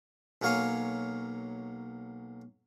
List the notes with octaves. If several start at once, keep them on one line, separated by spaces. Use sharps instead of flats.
B1 F#3 A#3 C#5 F5 G#5